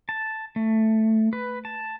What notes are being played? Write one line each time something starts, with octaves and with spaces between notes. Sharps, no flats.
A5
A3
B4
A5